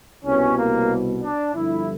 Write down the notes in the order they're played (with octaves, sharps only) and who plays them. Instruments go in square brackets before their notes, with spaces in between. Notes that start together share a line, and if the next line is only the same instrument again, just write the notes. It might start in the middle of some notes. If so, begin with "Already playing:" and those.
[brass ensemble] C2 B2 C#4
A#3
D4
G1 G2 D3 F3 E4